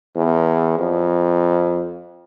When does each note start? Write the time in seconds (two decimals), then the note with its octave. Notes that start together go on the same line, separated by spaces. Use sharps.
0.16 E2
0.78 F2